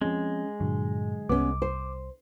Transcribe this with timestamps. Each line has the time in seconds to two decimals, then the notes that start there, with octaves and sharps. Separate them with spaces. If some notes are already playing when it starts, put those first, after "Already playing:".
0.01 F3 G#3 C4 C#4
0.60 G2 A#2 D3 F#3
1.29 C2 B3 C#4 D6
1.62 C5